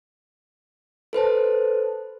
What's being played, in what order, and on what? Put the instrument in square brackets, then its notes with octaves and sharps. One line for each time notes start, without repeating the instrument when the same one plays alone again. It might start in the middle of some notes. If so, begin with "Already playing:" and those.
[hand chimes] A4 B4 C5 A5